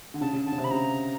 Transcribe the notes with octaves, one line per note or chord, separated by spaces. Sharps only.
D3
C#3 A5
C#3
D3 A5
C#3
C3
B5
C#3 A#5